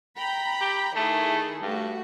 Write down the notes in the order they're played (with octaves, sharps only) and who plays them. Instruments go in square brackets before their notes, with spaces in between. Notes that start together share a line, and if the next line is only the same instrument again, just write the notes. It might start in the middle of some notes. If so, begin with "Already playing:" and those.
[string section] G5 A#5 B5
[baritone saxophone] G4
[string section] D#3 E4 G#4 [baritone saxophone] A3
[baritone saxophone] G2 [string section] A3 F#4